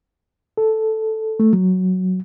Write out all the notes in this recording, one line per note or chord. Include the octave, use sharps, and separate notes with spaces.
A4
A3
F#3